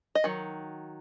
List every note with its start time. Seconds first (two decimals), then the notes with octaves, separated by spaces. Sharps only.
0.15 D#5
0.24 D#3 F#3